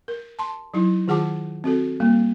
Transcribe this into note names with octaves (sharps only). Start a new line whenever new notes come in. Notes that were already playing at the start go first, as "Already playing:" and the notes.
A#4
A5 C6
F#3 D#4 E4
D#3 F4 G#4 F#5 A5 D6
C4 F#4 A4
G3 A#3